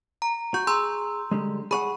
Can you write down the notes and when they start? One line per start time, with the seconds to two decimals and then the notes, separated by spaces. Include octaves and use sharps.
0.22 A#5
0.54 F#4 C#6 G6
0.67 G#4 A#5 C6 E6
1.31 D3 G3 G#3
1.71 G#4 D5 F#5 B5 C#6